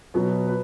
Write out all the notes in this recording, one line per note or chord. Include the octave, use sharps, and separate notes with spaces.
B2 F#3 B3
B4